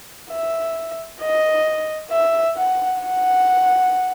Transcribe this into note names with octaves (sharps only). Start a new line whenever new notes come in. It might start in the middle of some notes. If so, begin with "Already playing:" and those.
E5
D#5
E5
F#5
F#5